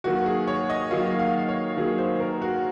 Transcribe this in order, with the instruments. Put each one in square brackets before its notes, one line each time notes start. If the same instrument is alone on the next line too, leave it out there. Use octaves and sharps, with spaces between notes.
[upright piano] D#3 F#3 A#3 F#4
G#4
C#5
D#5
D#3 F#3 A#3 F5
F5
C#5
D#3 F#3 A#3 G#4
C5
A#4
F#4